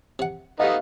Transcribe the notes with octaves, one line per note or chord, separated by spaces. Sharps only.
C3 F#5
A3 B3 D#4 G4 D#5 F5